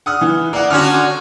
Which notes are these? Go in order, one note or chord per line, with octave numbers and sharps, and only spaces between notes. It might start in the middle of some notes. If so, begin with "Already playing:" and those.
F#5 D#6 F6
E3
A#3 D5 F#5
D3 C#4 F#4 F6